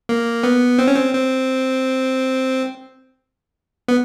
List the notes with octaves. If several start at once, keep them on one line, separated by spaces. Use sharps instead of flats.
A#3
B3
C4
C#4
C4
C4
B3